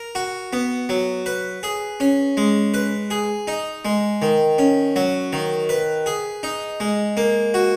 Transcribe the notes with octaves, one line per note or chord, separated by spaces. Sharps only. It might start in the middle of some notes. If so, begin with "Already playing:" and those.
Already playing: A#4
F#4
B3
F#3
B4
G#4
C#4
G#3
B4
G#4
D#4
G#3
D#3
C#4
F#3
D#3
B4
G#4
D#4
G#3
A#3
F#4